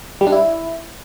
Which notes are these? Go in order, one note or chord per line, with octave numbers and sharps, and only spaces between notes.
G3
D4
E4